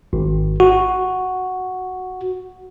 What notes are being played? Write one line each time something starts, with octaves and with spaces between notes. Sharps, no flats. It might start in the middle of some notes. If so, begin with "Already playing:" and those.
G#1
F#4